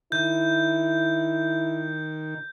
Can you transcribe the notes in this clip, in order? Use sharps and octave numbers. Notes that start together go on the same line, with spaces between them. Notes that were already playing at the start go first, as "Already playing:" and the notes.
D#3 E4 G6